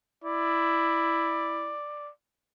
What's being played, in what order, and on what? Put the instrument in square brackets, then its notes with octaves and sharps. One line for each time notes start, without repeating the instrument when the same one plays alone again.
[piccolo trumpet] E4 [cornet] D5